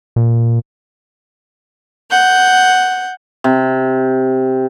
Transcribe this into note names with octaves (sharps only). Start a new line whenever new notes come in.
A#2
F#5 G6
C3